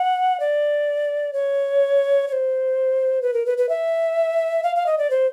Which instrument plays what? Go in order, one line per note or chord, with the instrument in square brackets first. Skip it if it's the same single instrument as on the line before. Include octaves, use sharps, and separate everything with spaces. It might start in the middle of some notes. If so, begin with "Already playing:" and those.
Already playing: [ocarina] F#5
D5
C#5
C#5
C5
B4
A#4
B4
B4
E5
F5
F5
D#5
D5
C5